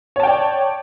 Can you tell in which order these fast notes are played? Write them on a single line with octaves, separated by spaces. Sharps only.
C#5 A5 G5 D5